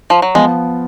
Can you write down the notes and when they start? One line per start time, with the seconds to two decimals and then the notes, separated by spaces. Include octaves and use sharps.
0.10 F3
0.22 F#3
0.35 F3 G#3 B3